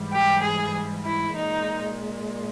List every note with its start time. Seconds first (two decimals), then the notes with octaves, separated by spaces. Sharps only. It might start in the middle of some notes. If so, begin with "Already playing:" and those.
Already playing: G#2 E3 G3
0.11 G4
0.42 G#4
1.03 E4
1.34 A#2 G#3 D#4